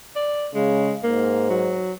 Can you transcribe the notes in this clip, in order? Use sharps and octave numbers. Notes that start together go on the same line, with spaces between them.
D5
C#3 G#3
G#2 A#3
F#3